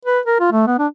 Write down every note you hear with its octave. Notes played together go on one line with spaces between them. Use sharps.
B4
A#4
F4
A3
B3
D4